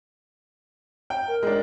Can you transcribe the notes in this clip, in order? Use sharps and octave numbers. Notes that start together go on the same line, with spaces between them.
G5
A#4
G#3 D4